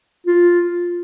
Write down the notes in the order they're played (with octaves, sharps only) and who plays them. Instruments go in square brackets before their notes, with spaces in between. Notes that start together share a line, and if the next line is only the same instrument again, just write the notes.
[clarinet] F4